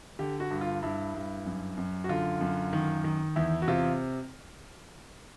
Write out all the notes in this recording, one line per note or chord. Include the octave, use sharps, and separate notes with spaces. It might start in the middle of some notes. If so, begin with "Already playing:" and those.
D3 G4
F#4
G2
F4
G2 E4
G2
F#2
F#2
F#4
D3 F4
F#2
D#3
D#3
E2 E4
F#4
C3 F4